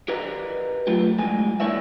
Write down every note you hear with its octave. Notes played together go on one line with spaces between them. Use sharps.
G4 A#4 B4 D5 D#5 A#5
F#3 A3 F4 G4
A2 G3 G#3 G#5
A#3 E4 A#4 C#5 D5 E5